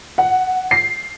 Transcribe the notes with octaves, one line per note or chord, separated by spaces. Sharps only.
F#5
C7